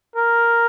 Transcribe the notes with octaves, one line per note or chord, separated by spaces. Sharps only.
A#4